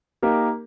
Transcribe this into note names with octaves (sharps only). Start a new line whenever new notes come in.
A#3 D#4 G4 A#4